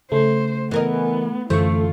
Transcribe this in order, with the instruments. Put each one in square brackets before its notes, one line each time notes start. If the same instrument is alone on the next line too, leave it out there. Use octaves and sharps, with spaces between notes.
[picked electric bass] C#3 [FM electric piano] A3 [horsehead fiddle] C5
[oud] E3 A#4 D#5 [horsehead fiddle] B3
[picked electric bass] F#2 D3 E3 [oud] A3 [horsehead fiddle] F4 [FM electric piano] C5 C#6